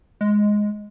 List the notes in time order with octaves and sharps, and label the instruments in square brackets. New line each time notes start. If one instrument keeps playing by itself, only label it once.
[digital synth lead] G#3